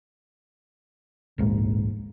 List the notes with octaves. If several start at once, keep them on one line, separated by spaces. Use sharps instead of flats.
D1 A#1 G#2 A#3